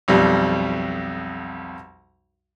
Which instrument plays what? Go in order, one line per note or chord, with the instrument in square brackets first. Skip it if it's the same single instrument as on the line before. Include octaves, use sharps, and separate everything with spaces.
[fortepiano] B1 F2 G3